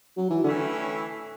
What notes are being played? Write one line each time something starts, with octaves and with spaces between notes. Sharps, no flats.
F#3
E3
A2 D3 E3 A3 C#4